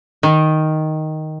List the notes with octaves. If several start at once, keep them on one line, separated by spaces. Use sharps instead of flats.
D#3